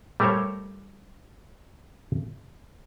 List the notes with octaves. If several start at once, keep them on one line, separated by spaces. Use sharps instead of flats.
G3 A3 G4 A#4 C5 C#5